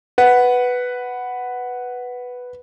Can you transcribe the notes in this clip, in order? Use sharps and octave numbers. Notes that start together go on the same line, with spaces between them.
B4 F#5